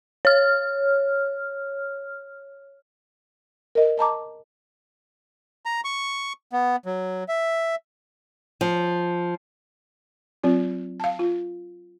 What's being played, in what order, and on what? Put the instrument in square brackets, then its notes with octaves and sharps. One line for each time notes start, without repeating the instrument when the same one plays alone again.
[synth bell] C#5 F6
[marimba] A#4 D#5
D#5 A5 A#5 D6
[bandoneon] A#5
C#6
B3
F#3
E5
[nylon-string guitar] F3
[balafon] F#3 C4 F4
F5 A5
F4